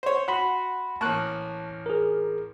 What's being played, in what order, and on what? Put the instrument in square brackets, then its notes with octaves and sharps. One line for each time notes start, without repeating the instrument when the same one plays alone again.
[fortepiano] C5 C#5
[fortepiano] F#4 [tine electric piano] F#5 B5 C6
[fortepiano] A1 A#3 [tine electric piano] A5 C#6 F#6
[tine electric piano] G#4 A#4